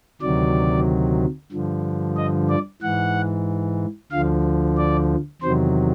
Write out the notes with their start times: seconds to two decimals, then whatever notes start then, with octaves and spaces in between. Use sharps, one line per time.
0.21 D2 C3 D#3 F#3 D5
1.52 G2 D3 F3
2.16 D#5
2.49 D5
2.81 G#2 E3 F#5
4.12 D2 D3 F3 F5
4.77 D5
5.42 E2 C3 D#3 F#3 C5